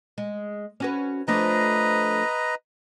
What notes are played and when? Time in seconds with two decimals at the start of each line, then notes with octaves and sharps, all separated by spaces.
0.18 G#3
0.80 C#4 F#4 B4
1.28 F3 A3 D4 B4 D#5 A#5